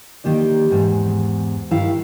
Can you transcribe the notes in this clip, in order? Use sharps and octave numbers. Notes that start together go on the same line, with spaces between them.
D#3 A#3 G4 D5
E2 G#2
G2 D#3 E4 F5